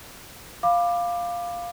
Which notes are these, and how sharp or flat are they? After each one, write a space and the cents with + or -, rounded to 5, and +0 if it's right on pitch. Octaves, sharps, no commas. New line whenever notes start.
F5 +0 B5 +5 D6 +15